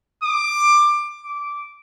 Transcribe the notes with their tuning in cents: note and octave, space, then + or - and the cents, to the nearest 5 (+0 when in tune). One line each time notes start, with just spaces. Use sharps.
D6 +15
D6 -10